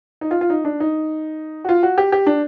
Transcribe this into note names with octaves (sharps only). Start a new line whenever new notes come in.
D#4
F4
F4
D#4
D4
D#4
F#4
F4
F#4
G4
G4
D4